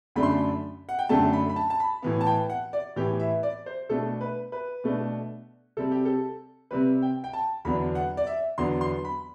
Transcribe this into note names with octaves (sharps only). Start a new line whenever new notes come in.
F#2 D3 A3 D4 B5
C6
B5
F#5
G5
F#2 D3 A3 D4 A5
B5
B5
A5
A5
B5
A2 E3 B3
A5
G5
F#5
D5
A2 E3 B3 G4
E5
D5
C5
B2 A3 D4 A4
B4
B4
B2 A3 D4
C3 G3 C4 A4
G4
A4
C3 G3 C4 B4
G5
G5
A5
E2 D3 F#3 B3 D4 B5
F#5
D5
E5
E2 D3 F#3 B3 D4 C6
C6
B5